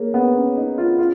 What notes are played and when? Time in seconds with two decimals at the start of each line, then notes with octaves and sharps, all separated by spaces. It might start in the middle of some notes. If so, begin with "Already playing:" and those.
Already playing: A#3 G#4 C#5
0.14 B3
0.35 C#4
0.57 D#4
0.78 F4
0.99 F4